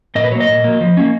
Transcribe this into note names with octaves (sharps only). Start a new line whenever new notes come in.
A#2 D#5
B4
F#3 A#3 C#5
D#5
A#2
F#3 A#3
F3
A#3 C#4